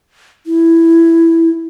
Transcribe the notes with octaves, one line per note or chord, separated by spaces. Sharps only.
E4